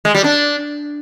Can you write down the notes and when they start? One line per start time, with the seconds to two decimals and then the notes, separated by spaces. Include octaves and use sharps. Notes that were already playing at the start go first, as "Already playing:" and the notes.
0.05 G#3
0.15 G3
0.24 D4